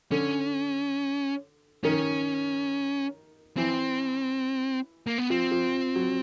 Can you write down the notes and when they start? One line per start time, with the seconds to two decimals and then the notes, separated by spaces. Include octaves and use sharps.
0.11 D3 C#4
1.84 D#3 C#4
3.57 E3 C4
5.07 A#3
5.18 B3
5.30 F3 C4
5.52 F3
5.95 F#3